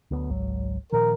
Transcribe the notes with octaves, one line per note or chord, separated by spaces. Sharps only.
D2 F#3 B3
G#1 C#2 F#3
A#2 D#3 F3 A#4